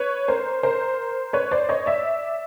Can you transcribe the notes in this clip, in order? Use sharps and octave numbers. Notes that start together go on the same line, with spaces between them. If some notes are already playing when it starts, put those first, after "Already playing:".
Already playing: B4 C#5
A#4 C5
A#4 C5
B4 C#5
C5 D5
C#5 D#5
D5 E5